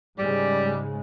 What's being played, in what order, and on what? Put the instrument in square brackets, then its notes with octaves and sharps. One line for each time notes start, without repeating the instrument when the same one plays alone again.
[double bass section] G#2 C#3 G#3 [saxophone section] G3